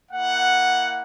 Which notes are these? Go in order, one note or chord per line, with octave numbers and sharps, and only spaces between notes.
A#3 E4 F#5